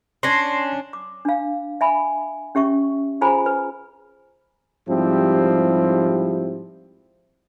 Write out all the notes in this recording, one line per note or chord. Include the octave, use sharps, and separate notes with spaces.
C#4 D4 C6 A#6 C7
D6
D4 F5
E5 G#5 B5
C#4 G4 E5 C#6
F4 G#4 C5 G#5 A#5 B5
B4
G#2 F3 G3 C4 E4 G4